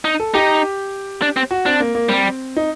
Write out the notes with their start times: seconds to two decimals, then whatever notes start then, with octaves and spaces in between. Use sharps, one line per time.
0.05 D#4
0.20 A4
0.34 D#4 G4
1.22 D4
1.36 C4
1.51 F#4
1.66 C4 D4
1.80 A#3
1.95 A#3
2.09 G3 C4
2.57 D#4